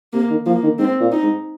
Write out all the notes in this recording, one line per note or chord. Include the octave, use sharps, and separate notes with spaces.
C3 A#3
D#3
F3 A#3
D#3
G#2 C4
A#2
D#4
G#2